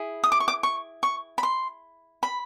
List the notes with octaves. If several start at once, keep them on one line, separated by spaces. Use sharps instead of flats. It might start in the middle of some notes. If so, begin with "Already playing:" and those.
Already playing: E4 G#4
D#6
D6
C#6
D6
C#6
C#6
B5
C6
B5